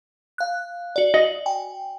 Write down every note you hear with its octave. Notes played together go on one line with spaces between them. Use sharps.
F5 F#6
F#4 D5
F#4 D#5
G5 G#5